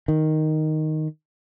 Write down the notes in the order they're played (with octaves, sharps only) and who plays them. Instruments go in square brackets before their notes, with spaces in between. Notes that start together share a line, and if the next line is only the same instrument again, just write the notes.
[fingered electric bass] D#3